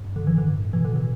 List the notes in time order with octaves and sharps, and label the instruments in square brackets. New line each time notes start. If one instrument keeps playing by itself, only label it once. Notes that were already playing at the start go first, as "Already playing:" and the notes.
Already playing: [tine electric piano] G2
[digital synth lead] D3
E3
[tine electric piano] A2 [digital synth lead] D3
[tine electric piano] G2
A2
[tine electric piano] B2 [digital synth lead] E3
[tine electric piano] A2
[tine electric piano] B2 [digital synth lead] D3
[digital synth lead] E3